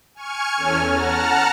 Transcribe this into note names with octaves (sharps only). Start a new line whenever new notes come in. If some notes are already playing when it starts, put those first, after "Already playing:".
G#5 C#6 F6 G#6 C#7
E2 C#4 A4 C#5 G#5 F6
F#5 A5 A#5 F6